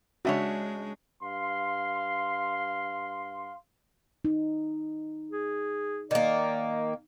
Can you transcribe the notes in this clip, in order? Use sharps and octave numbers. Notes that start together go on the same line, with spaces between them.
C#3 G#3 D4 F#4 C#5 E5
G2 F5 C6
D#4
G#4
D#3 A#3 D5